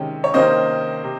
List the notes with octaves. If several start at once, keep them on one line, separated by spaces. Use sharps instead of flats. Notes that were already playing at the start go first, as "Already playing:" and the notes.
Already playing: C3 D#3 G#3 C#4
C#5
C3 D#3 A#3 C#4 C5 D#5
C3